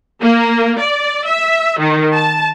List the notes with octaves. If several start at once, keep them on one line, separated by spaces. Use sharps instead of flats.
A#3
D5
E5
D#3
A5